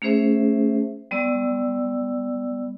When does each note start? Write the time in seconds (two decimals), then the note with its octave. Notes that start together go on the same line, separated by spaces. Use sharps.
0.02 A3 C#4 G#4 C5 E5
1.11 G3 B3 D5 E6